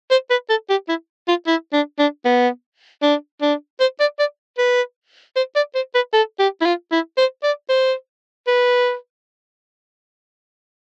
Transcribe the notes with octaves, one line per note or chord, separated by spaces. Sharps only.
C5
B4
A4
G4
E4
F4
E4
D4
D4
B3
D4
D4
C5
D5
D5
B4
C5
D5
C5
B4
A4
G4
E4
F4
E4
C5
D5
C5
B4